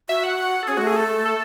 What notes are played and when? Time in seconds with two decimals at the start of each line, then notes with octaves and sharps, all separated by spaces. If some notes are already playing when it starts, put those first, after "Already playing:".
0.09 F#4 E5
0.24 F#5
0.63 A4
0.67 C#4 G#4
0.77 G#3 F#4
0.82 A3
0.87 G#4
0.96 A4
1.25 A4